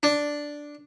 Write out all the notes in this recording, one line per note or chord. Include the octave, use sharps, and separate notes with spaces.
D4